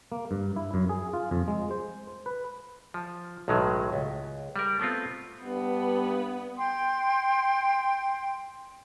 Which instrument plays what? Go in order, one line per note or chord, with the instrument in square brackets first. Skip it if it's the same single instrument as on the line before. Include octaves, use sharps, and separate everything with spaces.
[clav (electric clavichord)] A#3
G2
E4
F#2
G#4
F4
F2
G#3
C5
B4
F3
B1 A2 D#3 F#3 G#3
C#2
G3 A#4
A3 B3 C4 F4
[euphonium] G2 [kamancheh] B3
[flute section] G5 C6